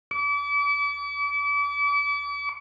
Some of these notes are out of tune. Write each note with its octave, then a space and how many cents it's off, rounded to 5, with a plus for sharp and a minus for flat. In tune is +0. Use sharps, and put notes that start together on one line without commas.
D6 -40